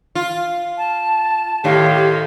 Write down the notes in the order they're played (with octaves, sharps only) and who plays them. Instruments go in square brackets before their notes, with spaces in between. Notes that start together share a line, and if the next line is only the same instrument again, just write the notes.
[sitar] F4
[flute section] A5
[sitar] A2 D#3 [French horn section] G4 [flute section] C#5 F5 C6